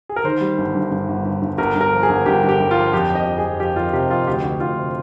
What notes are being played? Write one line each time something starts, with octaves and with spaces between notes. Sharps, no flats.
G#4
A#4
D#3 C5
G3
G1
G2
G2
G1
G1
G1
G1 A#4
G1
A#4
F3
G#4
G1
G1 G4
G1
G4
G1
F4
F3
F2 G4
F2
D#5
F2
G#4
F2
F3 G4
F2 F4
C3 G4
F2 F4
D2 G4
D2
D2 F4
C3